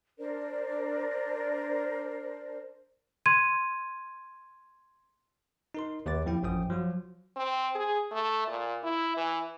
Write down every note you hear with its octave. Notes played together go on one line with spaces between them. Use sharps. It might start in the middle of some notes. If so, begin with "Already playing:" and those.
D4 A#4 C5 D5
C6 G#6 D#7
D#4 A#4 C6
D#2 G4 B4 C#5 D6 A6
F2 F3 E4 G5
A1 F#2 F3 G5 D#6
F3 F#3 F4 F#4
C4
G#4
A3
A#2
E4
E3